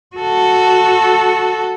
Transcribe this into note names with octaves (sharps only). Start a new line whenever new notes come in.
F#4 A4